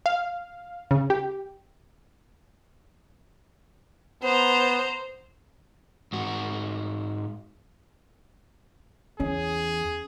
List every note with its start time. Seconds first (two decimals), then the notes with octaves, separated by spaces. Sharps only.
0.06 F5
0.91 C#3
1.10 G4
4.23 B3 C5 A#5
6.13 G#2 F#4
9.20 E2 C#4 G#4